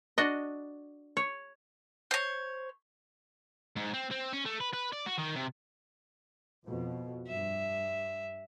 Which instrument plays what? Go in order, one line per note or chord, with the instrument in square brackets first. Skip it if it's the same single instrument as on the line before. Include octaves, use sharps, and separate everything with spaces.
[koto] D4 F#4 D#5
C#5
[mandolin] C5 C#5
[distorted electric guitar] G#2
C4
C4
C#4
A3
B4
B4
D5
F#4
D#3
C3
[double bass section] F2 B2
[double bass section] G2 [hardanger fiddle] E5